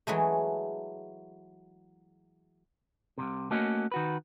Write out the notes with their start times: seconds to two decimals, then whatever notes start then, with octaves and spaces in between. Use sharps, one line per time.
0.07 E3 F#3 G#3 A3
3.18 C2 F2 C3
3.51 A3 A#3 C#4 F#4 D#5
3.92 D#3 F#4 B4